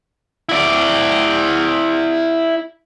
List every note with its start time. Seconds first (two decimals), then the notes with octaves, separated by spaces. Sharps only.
0.49 E4 D5